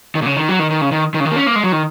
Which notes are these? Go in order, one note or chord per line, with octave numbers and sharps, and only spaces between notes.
D#3
A#2
C#3
D#3
F#3
D#3
D#3
C#3
D#3
D#3
C#3
D#3
A#3
C#4
A#3
G#3
F#3
D#3